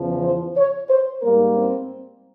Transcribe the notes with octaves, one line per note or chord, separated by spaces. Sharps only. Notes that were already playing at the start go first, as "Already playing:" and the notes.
Already playing: E2 C#3 F3
C5
C#5
C5
G#2 G3 A#3 A#4
C4